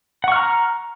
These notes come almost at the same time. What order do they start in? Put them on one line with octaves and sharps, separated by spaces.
F#5 C#6 F6 A#5